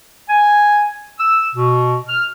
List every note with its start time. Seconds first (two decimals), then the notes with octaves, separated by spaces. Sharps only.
0.30 G#5
1.19 E6
1.55 B2
2.08 F6